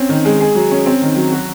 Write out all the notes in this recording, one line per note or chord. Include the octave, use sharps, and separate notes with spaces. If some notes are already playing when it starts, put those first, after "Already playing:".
Already playing: C4 C#4
D#3
G#3
G#4
F#3
C#4
C4
D#3
F#3
F#4